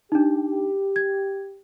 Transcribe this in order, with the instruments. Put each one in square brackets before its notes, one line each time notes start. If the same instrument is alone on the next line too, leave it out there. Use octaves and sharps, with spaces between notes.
[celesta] D4 D#4 [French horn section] G4
[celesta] G#6